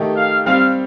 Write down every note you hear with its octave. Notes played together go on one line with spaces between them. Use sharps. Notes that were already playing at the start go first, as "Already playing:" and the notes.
Already playing: D#3 A3 D#4 G4
F5
G3 C4 G4 F5